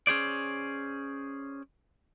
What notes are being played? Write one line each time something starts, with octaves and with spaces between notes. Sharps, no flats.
C#4 G#4 C5 D5